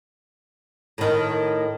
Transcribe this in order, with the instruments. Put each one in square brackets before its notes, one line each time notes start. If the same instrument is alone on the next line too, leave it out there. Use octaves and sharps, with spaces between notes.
[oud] A2 D#3